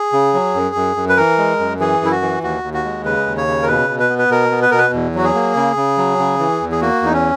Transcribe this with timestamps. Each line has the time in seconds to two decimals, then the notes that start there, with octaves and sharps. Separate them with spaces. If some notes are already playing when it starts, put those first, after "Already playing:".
Already playing: G#4
0.13 C#3
0.34 F#3
0.55 F#2
0.75 F#2
0.96 F#2
1.09 B4
1.17 E3 A#4
1.38 G#3
1.59 F#2
1.80 E3 G#4
2.01 F#2 E4
2.11 F#4
2.22 E3
2.43 D#2 F#4
2.63 D#2
2.74 F#4
2.84 G#3
3.05 C#3 B4
3.26 D#2
3.37 C#5
3.48 C#3
3.62 A#4
3.68 B2 B4
3.89 B2
4.00 B4
4.10 B3
4.19 B4
4.30 B2 A#4
4.51 B3
4.62 B4
4.71 B2 A#4
4.78 B4
4.94 E2
5.15 F#3 F#4
5.24 G#4
5.35 A#3
5.56 C#3
5.76 C#3
5.98 F#3
6.19 C#3
6.39 E3
6.61 E2
6.72 G#4
6.81 A#3 F#4
7.02 E2 D#4
7.13 C#4